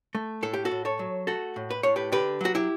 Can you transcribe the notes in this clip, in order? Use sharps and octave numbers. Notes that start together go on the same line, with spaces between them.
A3
A2 A4
G4
F#4 A4
A2
A4 C#5
F#3
A3 F#4 A4
A2
B4
A2 C#5
G4 B4
D3 G4 B4
F#3 F#4
E4 G4